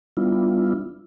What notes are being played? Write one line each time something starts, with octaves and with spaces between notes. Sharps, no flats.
G3 B3 D4 E4 F4